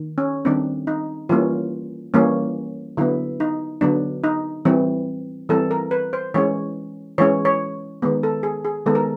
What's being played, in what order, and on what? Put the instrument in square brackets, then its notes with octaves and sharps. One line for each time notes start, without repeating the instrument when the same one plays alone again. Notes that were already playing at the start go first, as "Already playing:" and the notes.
Already playing: [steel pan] D#3
C#4
D#3 G3 C4 D4
D#4
E3 G3 A#3 C#4 F4
E3 G3 A#3 C#4
D3 F#3 B3 E4
D#4
D3 F#3 B3 D4
D#4
E3 G3 C4
E3 G3 C4 A4
A#4
B4
C5
E3 G#3 C#4 C#5
E3 G#3 C#4 C#5
C#5
D#3 G#3 B3
A4
G#4
G#4
D#3 G#3 B3 A4
A#4